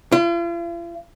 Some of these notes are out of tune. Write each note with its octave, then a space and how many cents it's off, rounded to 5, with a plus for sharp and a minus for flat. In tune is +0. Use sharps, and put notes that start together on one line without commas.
F4 -45